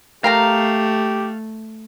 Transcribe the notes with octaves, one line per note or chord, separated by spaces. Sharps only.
A3 G4 A#4 F5 G5 A#5